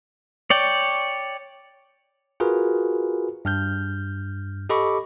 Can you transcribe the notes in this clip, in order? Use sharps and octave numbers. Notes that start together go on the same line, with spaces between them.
C#5 D5 G5
F4 F#4 G#4 A#4 B4
G2 F6 G6
G4 A4 D#5 B5 C#6 D6